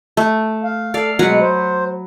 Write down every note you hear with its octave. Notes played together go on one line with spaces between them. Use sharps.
A3
F5
A4 D5 F5
B2 F#3 G#3 B4 F#5
C5